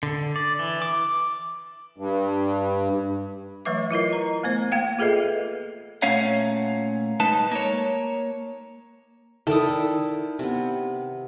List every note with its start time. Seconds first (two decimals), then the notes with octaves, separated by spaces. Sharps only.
0.03 D3
0.36 D5
0.59 E3
0.82 D6
1.98 G2
3.65 E3 F#3 A3 B4 E5 D6
3.91 E4 F4 A#4 D#5
4.13 A#5
4.44 A3 B3 C5
4.72 A#3 F5 G5
4.99 F4 G#4 A4 B4 D#5 E5
6.02 A#2 A3 C#4 C#5 F5 F#5
7.20 G#3 D#4 B4 A5
7.52 A#3 C#5
9.47 D#3 E4 A4 D5 E5 D#6
10.39 C3 B3